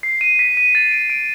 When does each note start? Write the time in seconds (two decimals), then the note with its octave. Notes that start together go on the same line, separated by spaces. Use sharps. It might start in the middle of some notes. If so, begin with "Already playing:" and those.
0.03 C7
0.21 D#7
0.39 B6
0.57 D#7
0.75 A6
0.91 D7
1.10 D7